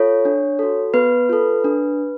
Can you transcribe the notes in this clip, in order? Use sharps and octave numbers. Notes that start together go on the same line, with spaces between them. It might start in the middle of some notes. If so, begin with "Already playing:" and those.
Already playing: F4 A4 C#5
D4
F#4 A4
B3 B4
F4 A4
D4